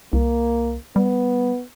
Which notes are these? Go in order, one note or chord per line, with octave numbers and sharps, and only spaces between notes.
C2 A#3
G3 B3